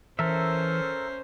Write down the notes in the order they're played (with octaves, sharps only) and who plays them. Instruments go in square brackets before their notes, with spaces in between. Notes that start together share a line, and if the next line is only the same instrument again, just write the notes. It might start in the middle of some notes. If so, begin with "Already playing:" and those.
[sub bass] E3 [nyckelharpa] C#4 C5 [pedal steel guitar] A4 A#4 E5